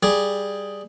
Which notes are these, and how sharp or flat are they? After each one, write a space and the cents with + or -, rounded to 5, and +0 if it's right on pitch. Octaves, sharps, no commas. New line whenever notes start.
G3 +10 G#4 +0